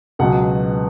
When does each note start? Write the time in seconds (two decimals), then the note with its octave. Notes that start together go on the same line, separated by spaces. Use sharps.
0.19 C#2 B2 F#3 F#5